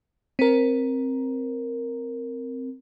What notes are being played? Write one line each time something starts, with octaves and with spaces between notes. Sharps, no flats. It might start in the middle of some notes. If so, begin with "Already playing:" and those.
C4 A#4